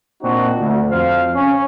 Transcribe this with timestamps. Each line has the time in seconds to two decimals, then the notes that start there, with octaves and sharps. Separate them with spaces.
0.22 A#2 C4 D4 D#4 F#4
0.59 D2
0.89 F2 C5 F5
1.34 C#4